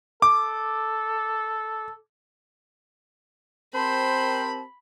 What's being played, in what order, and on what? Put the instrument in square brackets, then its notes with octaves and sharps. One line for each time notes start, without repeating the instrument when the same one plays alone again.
[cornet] A4 [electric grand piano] D6
[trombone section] C4 G4 A#4 [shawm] C5 [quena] A5 [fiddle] B5